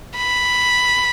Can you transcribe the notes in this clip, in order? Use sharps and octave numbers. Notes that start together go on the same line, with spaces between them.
B5